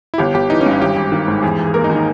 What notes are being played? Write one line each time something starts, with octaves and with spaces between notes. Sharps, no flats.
E4
G1 G4
G1 G4
E3 D#4
C#4
G2 E4
G#1 G4
G#1
D#3
G#2
E2 G#4
E2
G#4
A#3 A#4
D#4
D#3
D#4